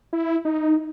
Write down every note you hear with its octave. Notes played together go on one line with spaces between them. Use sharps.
E4
D#4